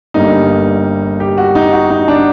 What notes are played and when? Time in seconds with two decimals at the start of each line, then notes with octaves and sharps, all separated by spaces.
0.14 G1 G2 D3 G3 A#3 D#4
1.20 G4
1.38 F#4
1.55 D#4
1.73 F#4
1.90 D#4
2.08 D4